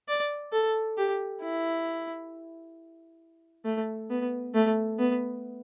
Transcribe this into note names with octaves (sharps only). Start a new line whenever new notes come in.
D5
A4
G4
E4
A3
B3
A3
B3